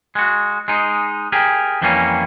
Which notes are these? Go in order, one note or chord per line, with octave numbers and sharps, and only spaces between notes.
G#3 F#4
G#3 D#4
G4 G#4 A#4
F2 E3 G3 A#3 C#4